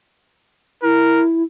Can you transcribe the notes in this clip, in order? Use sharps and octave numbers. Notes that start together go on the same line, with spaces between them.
E4 A#4